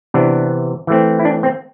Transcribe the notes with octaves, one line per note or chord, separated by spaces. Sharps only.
C3 E3 B3 D4
E3 A3 C4
E4
D4
C4